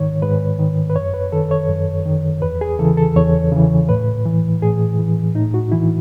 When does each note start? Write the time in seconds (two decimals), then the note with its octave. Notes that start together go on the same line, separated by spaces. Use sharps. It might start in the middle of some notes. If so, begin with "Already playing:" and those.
Already playing: G#2 D#3 C#5
0.22 G#2 B4
0.59 D#3
0.90 B4
0.96 F#2 C#5
1.14 B4
1.32 D#3 A4
1.51 C#5
1.69 F#2
2.06 D#3
2.42 E2 B4
2.61 G#4
2.79 C#3 E3 A4
2.97 A4
3.16 E2 C#5
3.52 C#3 E3
3.89 A2 B4
4.25 E3
4.62 A2 G#4
4.99 E3
5.35 A2 D#4
5.54 F#4
5.72 E3 E4